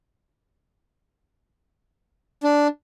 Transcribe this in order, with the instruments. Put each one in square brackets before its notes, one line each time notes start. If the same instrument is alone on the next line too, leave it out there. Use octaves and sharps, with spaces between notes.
[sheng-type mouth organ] D4